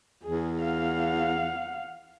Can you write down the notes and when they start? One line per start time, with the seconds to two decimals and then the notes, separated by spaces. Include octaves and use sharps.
0.23 E2 G#4
0.61 F5 F#5